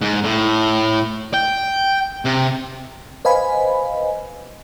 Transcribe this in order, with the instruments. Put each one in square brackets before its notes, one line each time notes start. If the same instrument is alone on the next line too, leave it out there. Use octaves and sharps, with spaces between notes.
[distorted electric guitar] G#2
A2
G5
C3
[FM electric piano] B4 C5 D#5 F5 G#5 B5